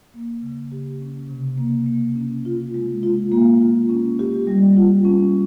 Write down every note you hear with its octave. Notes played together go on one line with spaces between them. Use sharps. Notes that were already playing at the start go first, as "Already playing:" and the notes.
A#3
C#3
G4
C#4
C3
A#3
A#3
C#4
F4
G#3
F4
A#3
F4
C#4
G4
G3
F4
C#4